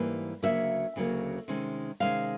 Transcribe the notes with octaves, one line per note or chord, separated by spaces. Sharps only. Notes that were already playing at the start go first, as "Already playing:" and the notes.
Already playing: G#2 E3 G3 A#3
D2 C#3 F#3 A#3 E5
D2 C#3 F#3 A#3
C3 D#3 G#3 C#4
C3 D#3 G#3 C#4 F5